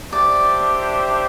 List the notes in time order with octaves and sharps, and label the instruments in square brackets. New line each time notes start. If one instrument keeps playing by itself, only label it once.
[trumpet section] D4 G4 C5 E5 [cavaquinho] D5